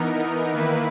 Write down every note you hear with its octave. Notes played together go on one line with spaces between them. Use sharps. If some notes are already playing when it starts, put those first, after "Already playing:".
Already playing: E3 B3 D#4 A#4
D#3 A#3 E4 B4